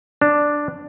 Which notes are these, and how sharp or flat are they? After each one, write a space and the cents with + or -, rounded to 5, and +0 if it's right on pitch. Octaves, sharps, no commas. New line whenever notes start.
D4 +0